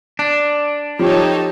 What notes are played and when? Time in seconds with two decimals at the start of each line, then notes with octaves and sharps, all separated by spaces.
0.19 D4
0.99 F3 D#4 G4 A4 C#5